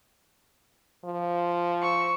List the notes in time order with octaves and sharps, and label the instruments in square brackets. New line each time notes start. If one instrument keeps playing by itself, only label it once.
[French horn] F3
[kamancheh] C#6 E6